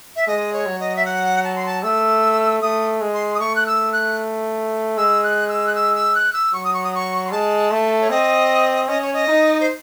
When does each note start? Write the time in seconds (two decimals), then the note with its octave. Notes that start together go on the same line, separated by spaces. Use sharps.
0.16 E5
0.27 G#3 D#5
0.53 C#5
0.66 F#3
0.80 D#5
0.96 E5
1.05 F#5
1.44 A5
1.56 C6
1.66 A5
1.83 A3 E6
2.62 A3 D#6
3.01 G#3
3.14 C6
3.34 D#6
3.40 A3 C#6
3.56 F#6
3.67 E6
3.93 F#6
4.97 G#3 E6
5.24 F#6
5.49 E6
5.67 F#6
5.75 E6
5.95 E6
6.15 F#6
6.33 E6
6.53 F#3 C#6
6.64 D#6
6.74 C#6
6.84 D#6
6.95 C#6
7.27 C6
7.32 G#3 A5
7.71 A3
8.01 C#5
8.10 C4 D#5
8.88 C#4 D#5
9.02 C#5
9.14 D#5
9.28 D#4
9.60 C5